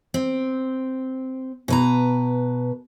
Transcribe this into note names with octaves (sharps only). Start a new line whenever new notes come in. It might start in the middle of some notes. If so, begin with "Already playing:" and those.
C4
B2 B4 A#5